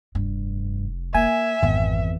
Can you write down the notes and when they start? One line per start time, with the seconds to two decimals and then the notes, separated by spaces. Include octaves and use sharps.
0.15 F1 G2
1.14 A#3 E5 G#5
1.63 G#1 F2 E3 B3